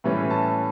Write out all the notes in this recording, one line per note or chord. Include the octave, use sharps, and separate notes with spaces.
A2 E3 G3 C#4 E4 B4
A5